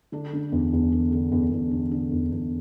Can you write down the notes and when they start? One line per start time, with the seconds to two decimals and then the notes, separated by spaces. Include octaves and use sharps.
0.12 D3 D4
0.33 D3
0.52 E2
0.73 E2
0.92 D3 D4
1.12 D3
1.32 E2
1.52 E2
1.71 D3
1.91 D3
2.12 E2
2.32 E2